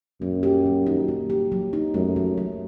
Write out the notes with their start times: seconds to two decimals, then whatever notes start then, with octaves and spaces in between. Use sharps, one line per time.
0.21 F#2 A#3
0.43 G4
0.66 F#3
0.87 D#4
1.08 A#3
1.30 G4
1.52 F#3
1.73 D#4
1.94 F#2 A3
2.16 F#3
2.38 F#3